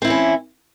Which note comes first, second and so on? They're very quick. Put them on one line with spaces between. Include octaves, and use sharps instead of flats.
C4 E4 E3 C#4